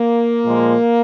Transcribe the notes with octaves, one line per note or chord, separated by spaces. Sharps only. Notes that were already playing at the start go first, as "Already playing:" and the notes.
Already playing: A#3
A#2 F3 G#3